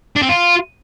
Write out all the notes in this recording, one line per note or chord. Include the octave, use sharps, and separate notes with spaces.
D4
C4
F4